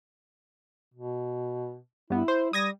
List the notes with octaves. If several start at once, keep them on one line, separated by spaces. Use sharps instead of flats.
B2
G2 B3 E4
C5
G3 D#6 G#6 A#6